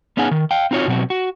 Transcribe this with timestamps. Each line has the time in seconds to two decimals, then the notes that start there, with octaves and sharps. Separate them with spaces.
0.17 B3 C#4 D#4 G#4 F#5 G#5
0.31 D#3
0.51 F5 G5
0.71 C4 D#4 F4 F#4 C#5
0.87 B2 F#3 C4 F#4
1.10 F#4